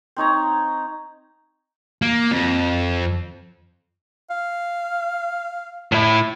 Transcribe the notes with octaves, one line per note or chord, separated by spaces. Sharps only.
C4 D#4 C#5 A#5
A#3
F2
F5
A2 E4